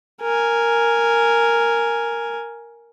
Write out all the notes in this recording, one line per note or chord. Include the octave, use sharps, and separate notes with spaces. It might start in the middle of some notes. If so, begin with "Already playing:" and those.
A#4 G#5